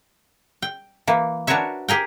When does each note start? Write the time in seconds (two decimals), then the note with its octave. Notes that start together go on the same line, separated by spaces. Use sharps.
0.62 G5
1.07 E3 A#3
1.47 D4 F#4 A#4 B4 C#5 E5
1.88 G4 G#4 A#4 G5